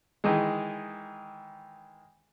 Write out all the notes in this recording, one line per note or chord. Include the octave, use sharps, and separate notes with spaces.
D#3 E3 G#3